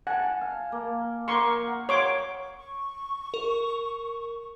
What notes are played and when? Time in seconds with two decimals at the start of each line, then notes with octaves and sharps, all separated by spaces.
0.07 F#5 G#5 A5
0.41 F5
0.72 A#3
1.28 A#3 A#4 C6 C#6
1.67 F#5
1.89 C#5 C6 D6
2.55 C#6
3.34 A#4